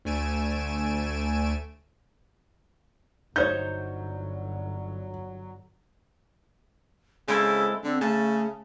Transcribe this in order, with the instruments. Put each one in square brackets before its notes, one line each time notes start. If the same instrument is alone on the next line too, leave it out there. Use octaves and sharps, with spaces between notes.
[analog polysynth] D2 A3 G#5 D7 E7
[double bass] G1 [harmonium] F#3 [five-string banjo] D#4 C5 C#5 [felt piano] G6
[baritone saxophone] C#3 [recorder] G#3 [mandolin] C4 E4 A4
[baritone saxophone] D3 [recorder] C4
[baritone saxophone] C#3 [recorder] A3 [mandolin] A5